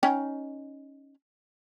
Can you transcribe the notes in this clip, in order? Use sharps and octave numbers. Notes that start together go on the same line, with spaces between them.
C#4 D#4 G5